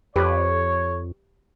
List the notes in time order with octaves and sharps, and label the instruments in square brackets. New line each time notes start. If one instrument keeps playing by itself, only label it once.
[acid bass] F2 [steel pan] G4 B4 [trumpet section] C#5